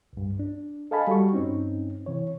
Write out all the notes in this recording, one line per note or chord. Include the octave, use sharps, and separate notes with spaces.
C2 G2
D4
A4 D#5 F5 G#5 A5 B5
G3 F#4 C#6
G2 C4 C#4 D#4
C3 E3 C#5